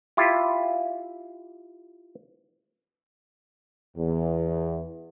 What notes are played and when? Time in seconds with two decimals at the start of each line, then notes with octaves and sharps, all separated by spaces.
0.17 E4 F4 G4
3.97 E2